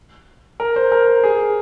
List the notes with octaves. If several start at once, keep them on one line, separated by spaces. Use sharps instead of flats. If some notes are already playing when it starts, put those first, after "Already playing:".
A#4
C5
A#4
G#4